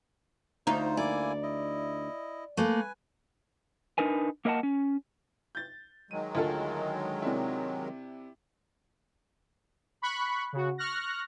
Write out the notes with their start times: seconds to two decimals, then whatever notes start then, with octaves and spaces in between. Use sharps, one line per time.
0.67 D2 D#4 F4 C5
0.97 A#3 E4 D5 G#5
1.43 E4 D#5
2.57 A3 A#3 B4 G#5
3.98 D4 D#4 A#4 B4 G#5
4.45 A#3 A#4 D#5 E5 F#5 A5
4.63 C#4
5.55 G6 A6
6.11 D#3 F#3 G#3 D#7
6.35 D2 F4 A4
7.22 C3 D4 E4
10.02 B5 C#6 F#6
10.53 C#3 F#4
10.78 C#6 F6 F#6 A#6